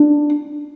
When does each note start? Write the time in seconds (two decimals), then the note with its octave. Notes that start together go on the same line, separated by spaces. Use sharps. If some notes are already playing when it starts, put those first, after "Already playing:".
Already playing: D4